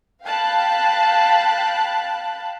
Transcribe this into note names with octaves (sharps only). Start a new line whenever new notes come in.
F5 G5 A5 B5 F#6